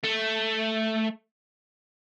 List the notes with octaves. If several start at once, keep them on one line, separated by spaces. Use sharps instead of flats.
A3